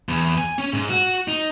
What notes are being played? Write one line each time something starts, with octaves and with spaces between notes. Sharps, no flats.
E2
G#5
C#4
G#2
F#4
D#4